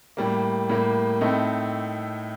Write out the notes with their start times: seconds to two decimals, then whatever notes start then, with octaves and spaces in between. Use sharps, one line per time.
0.17 A2 G3 A#3
0.69 A2 G3 A#3
1.21 A2 A3 C4 D#4